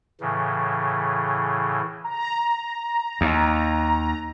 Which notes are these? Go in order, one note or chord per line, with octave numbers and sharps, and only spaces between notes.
A2 C#3 E3
A#5
D#2